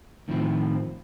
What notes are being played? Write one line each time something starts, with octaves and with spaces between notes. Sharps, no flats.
A2 D#3 F3 C4 E4 F4